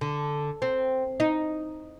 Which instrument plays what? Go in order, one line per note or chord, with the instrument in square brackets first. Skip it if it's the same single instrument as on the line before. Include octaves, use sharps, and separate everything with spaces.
[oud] D3
C4
D#4